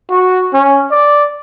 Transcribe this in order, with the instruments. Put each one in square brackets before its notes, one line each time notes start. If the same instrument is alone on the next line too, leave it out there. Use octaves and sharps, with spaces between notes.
[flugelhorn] F#4
C#4
D5